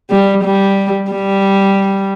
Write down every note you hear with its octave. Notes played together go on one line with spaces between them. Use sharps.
G3
G3
G3